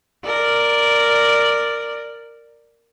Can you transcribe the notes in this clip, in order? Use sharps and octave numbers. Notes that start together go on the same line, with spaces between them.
A#4 D5